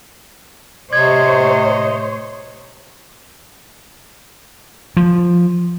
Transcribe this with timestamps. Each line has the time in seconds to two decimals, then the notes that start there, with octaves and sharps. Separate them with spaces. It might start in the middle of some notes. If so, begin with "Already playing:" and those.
0.93 A2 C3 C5 C#5 D#5 G#6
4.97 F3